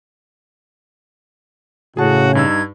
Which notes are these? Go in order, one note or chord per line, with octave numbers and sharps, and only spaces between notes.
A2 C#3 F#4 G#4 A5
G2 D#4 E6 G#6